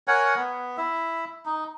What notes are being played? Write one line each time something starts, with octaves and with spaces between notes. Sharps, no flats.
A#4 C#5 F#5 G#5
B3
E4 E5
D#4